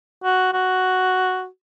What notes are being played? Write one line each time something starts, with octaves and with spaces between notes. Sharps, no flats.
F#4
F#4